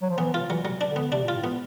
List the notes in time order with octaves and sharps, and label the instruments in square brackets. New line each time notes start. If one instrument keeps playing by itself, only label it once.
[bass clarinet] F#3
F3
[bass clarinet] E3 [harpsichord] B3
[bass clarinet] E3 [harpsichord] F4
[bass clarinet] E3 [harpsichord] F#3
[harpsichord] F#3
D4
[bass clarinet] D3
[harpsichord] B3
[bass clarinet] C3 [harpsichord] D4
[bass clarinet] A#2
[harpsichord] F4
[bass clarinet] A2
[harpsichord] B3